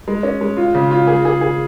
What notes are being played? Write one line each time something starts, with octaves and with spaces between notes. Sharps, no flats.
G#3
C#4
G#3
F4
C#3
F4
G#4
G#4
G#4